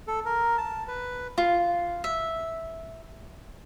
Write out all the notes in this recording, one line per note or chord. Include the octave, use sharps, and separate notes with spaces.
A4
A#4
A5
B4
F4
E5